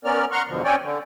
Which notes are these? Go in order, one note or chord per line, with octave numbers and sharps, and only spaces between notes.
B3 C#4 A#4 D5 F6
F#5 A#5 C6 C#6 F6
E2 G2 B2 D3 F3
C4 C#4 C#5 D5 G5 G#5
D3